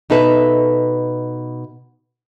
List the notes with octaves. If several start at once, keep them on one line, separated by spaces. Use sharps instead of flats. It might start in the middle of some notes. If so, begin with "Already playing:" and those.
B2 D#4 A4 B4 E5